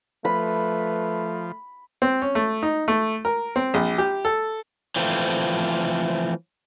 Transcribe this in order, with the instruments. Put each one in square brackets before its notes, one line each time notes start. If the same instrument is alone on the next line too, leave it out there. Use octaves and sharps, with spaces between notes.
[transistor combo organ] F3 [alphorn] A3 [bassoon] B4 [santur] B5
[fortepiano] C4
C#4
A3
D#4
A3
A#4
C4
A#1
G4
A4
[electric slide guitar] E3 F3 A3 C4